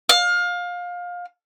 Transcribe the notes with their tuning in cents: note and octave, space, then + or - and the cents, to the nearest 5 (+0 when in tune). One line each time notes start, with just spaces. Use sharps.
F5 +25